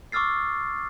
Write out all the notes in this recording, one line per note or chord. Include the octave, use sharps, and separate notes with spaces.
C#6 D6 E6 F6 A6 C7